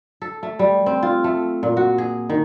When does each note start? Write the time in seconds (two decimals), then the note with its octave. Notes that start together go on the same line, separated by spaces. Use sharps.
0.22 A4
0.43 A3
0.59 G3
0.86 C4
1.03 F4
1.24 A3
1.63 A#2
1.77 F#4
1.98 G#4
2.29 D#3